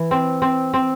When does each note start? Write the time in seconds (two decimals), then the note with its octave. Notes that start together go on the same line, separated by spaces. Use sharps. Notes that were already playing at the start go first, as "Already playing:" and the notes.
Already playing: E3
0.11 C4
0.42 C4
0.74 C4